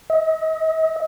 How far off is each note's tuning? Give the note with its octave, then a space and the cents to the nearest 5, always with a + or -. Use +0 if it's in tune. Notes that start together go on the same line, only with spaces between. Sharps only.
D#5 +35